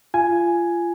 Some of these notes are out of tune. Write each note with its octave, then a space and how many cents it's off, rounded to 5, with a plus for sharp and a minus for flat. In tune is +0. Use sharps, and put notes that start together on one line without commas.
F4 -25 G#5 +5